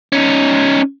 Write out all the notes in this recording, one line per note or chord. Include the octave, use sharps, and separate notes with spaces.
C#4 D#4